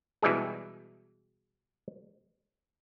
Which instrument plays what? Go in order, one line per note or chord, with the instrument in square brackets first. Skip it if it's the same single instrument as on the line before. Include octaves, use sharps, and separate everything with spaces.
[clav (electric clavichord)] B2 E3 G3 G#3 G#4